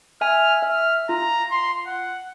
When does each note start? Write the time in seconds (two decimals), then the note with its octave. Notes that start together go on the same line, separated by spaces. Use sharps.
0.21 E5 G#5 F6
0.62 E5 F6
1.09 F4 A#5
1.51 C6
1.86 F#5